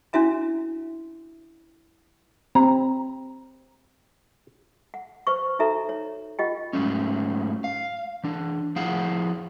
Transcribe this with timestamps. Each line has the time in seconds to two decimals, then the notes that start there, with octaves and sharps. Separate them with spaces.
0.13 C#4 D4 E4 F#4 E5 A#5
2.55 C4 A#5
4.94 F#5
5.27 B4 C5 C#6
5.59 D#4 F#4 A4 E5 A#5
5.89 C#5
6.39 F4 G4 D#5 F#5 G5
6.73 G#2 F#3 G#3 A3 C#4
7.64 F5
8.24 E3 D4
8.76 F3 E4 G#4 F5 F#5